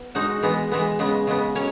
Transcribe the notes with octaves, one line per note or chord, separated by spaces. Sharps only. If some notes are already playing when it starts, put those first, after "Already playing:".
Already playing: B3
G#3 D#4 F#4
E3 G#3 B3
E3 G#3 B3
C#3 G#3 B3
C#3 G#3 B3
F#3 C#4 C#5